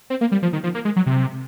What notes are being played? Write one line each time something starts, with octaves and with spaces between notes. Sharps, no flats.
C4
A#3
G3
F3
D#3
F3
A#3
G#3
F#3
C3